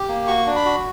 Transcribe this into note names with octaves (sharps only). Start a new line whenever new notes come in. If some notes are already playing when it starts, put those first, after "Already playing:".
Already playing: G4
A#3
F#4 C#6
D4
B5
F#4